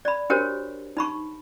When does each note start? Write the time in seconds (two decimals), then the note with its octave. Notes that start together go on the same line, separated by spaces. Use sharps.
0.05 D5 B5
0.30 D4 F#4 G4 A#4 C5 C#5
0.97 D#4 B5 C#6